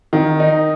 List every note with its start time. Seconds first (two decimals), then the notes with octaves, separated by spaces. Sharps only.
0.13 D#3
0.40 D#4